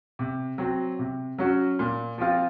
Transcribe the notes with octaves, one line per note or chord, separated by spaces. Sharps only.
C3
F#3 C4
C3
F#3 C#4 F#4
A#2
F3 C4 F4